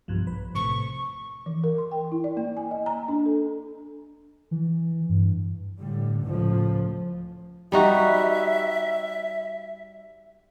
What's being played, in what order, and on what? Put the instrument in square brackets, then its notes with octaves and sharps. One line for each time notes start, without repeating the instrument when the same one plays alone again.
[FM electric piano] B1 G2 F3
B4
[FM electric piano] A2 C3 [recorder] C#6
[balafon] E3
A#4
C6
G5
E4
D5
A#3
G#5
D#5
A#5
D4
A4
[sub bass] E3
G2
[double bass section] A2 D3 G3
C#2 A2 F3
[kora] G3 D#4 F#4 [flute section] E5